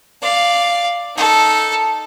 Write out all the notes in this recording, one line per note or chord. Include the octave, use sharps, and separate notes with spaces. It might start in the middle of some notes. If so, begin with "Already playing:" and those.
D5 F5
D#4 A4